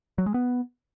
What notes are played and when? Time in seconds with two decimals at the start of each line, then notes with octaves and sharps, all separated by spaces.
0.18 F#3
0.26 G#3
0.34 B3